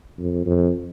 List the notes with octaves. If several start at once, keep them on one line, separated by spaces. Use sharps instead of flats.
F2
F2